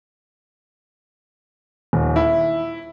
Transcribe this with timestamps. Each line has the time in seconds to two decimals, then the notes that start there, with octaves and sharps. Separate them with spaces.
1.93 D#1
2.16 E4